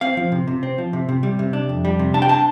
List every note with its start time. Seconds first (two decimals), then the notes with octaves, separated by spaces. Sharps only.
0.01 C4 F5
0.17 F3
0.32 C3
0.48 C3
0.63 C4
0.78 F3
0.93 C3
1.09 C3
1.23 G3
1.39 C3
1.53 D4
1.69 F2
1.85 G3
1.99 C3
2.14 D4 A5
2.22 G5
2.29 A5